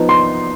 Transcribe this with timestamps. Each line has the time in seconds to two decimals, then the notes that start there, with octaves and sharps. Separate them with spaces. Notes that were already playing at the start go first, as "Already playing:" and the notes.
Already playing: F3 B3 D#4
0.09 C6